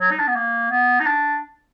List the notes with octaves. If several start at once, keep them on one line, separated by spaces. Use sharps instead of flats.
F#3
D#4
D4
B3
A#3
B3
D#4
D4